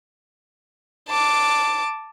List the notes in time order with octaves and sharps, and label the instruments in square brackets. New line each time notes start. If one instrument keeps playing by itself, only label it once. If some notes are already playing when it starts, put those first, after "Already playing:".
[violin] A5 D6